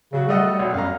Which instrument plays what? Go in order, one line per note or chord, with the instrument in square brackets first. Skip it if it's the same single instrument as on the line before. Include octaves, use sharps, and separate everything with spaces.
[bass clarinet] C#3 [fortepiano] F#3 F#4
[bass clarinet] G3 [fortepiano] A3 D#5 F#5
[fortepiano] B1 F#3
[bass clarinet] F#2 [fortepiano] F5 A#5